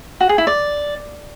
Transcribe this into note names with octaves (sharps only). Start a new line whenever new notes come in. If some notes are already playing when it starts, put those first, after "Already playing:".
F#4
G#4
E4
D5